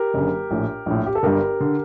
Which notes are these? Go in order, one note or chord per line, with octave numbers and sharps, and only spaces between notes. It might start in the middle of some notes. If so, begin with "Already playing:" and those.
Already playing: G4 A#4
F#1 F#2 D3
A#1 A2
A#1 A2
G4
A4
G1 G2 D3 G4 A#4
D3